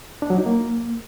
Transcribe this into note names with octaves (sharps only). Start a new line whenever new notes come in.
D4
F#3
D#4
A#3